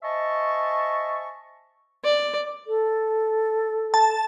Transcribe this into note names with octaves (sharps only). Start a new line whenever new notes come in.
C5 D#5 E5 G#5 A5 C#6
D5
A4
A5